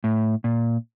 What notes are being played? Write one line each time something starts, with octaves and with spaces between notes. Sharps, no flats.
A2
A#2